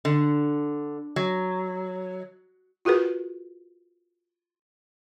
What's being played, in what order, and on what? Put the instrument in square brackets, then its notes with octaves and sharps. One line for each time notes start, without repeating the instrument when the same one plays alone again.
[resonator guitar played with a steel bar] D3
F#3
[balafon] F4 F#4 G#4 A#4 B4